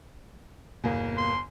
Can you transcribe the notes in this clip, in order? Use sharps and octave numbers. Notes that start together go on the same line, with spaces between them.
G1 E2 B2 A#3
C6